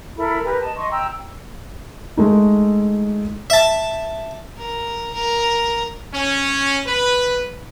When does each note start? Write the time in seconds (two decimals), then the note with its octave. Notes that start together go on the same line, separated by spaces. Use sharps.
0.17 E4 A4 A#4 B5
0.43 G4 A#4 B4
0.61 D#5 A5
0.76 D#5 C6 C#6
0.90 G5 A#5 E6
2.17 G#3 A3 D#4
3.50 E5 A5
4.58 A#4
5.14 A#4
6.12 C#4
6.85 B4